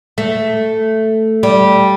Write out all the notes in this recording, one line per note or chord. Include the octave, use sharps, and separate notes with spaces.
A3
G3